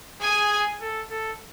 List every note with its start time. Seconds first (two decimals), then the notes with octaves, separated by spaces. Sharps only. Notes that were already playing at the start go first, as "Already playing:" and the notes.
0.21 G#4 G#5
0.81 A4
1.11 A4